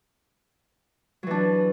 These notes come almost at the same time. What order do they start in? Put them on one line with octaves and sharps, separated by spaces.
F#3 E3 D4